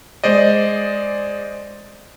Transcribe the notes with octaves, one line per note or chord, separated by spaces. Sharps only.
G#3 C5 D5 D#5